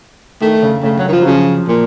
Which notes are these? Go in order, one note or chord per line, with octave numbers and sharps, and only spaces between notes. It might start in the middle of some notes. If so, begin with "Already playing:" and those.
D#3 A3
C#3
C#3 A3
F#3
D#3
F3
F#3
C#3 F3
A#2